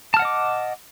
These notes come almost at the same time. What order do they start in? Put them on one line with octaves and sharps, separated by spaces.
A5 F6 F#5 D#5 D6